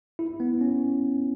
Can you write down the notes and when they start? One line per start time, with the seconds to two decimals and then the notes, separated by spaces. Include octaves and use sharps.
0.19 E4
0.40 B3
0.61 C#4